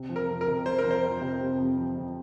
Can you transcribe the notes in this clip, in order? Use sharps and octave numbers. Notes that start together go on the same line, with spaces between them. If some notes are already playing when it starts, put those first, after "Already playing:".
Already playing: C3
F3
A#4
F2
A#4
C3
F2 C5
A#4
F3
C5
F2
C3
C3
F2
F3
C3